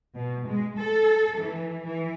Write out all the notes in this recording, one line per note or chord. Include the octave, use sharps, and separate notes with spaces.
B2
G#3
A4
E3
E3